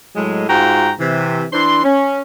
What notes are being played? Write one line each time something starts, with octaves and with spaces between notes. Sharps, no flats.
A2 F#3 G#3
G#2 F4 F#4 G5 A#5
C3 E3
E3 D4 C6
C#4